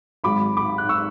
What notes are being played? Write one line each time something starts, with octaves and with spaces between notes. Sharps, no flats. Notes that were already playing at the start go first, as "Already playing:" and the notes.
G#1 G#2 F#3 B5 D6
B5 D6
F#6
C#6 E6